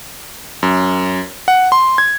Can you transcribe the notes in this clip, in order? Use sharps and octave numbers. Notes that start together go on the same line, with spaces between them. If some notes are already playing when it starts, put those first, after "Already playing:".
F#2
F#5
C6
G#6